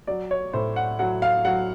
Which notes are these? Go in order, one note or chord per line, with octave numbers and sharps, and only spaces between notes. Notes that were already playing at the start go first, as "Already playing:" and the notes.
F#3 D5
C#5
A2 C5
F#5
F#3 F#5
F5
F#3 F#5